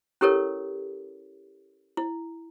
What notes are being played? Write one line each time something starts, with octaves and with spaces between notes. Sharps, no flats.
C#4 E4 G4 A4 A#4 C#5
E4